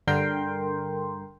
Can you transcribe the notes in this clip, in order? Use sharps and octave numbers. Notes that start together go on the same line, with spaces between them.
G2 D3 A#4 G5 C6